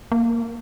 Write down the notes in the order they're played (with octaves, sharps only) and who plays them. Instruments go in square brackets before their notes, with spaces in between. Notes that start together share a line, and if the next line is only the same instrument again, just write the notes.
[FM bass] A#3